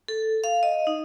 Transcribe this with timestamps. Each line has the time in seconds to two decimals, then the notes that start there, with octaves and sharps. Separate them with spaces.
0.08 A4
0.44 F5
0.63 D#5
0.87 D#4